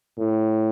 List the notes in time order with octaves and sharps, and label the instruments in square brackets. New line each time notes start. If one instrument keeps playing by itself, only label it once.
[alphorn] A2